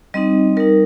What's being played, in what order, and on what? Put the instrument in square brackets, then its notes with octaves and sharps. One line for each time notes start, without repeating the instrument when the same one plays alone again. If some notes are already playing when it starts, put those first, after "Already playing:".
[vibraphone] G3 C4 D#4 D#5
G3 D#4 A#4